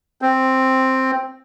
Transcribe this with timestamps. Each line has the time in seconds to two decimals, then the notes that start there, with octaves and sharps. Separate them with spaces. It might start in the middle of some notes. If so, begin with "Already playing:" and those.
0.22 C4